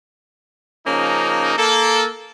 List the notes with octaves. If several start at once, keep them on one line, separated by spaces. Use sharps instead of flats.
C#3 F3 A#3 C#4 D#4
A#3 A4